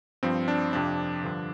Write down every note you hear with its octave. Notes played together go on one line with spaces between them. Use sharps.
G2 F3 C4
D4
F2 C3 F3 D4
G2 D3 F3